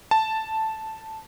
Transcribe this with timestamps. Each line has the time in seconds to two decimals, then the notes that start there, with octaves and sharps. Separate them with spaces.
0.11 A5